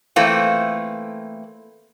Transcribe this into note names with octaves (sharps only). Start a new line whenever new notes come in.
E3 A3 A#3 C4 F4